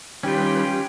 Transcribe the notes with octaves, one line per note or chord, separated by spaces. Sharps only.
D#3 G3 C#4 F4 G4 B4 G5